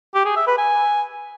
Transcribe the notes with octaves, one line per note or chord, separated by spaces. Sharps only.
G4
G#4
E5
B4
G#5